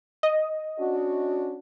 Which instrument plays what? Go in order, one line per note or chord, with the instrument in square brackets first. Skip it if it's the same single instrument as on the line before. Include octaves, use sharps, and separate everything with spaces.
[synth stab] D#5
[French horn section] C#4 D4 F#4